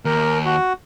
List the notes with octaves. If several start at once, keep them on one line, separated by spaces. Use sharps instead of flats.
D#2 A#4
F#4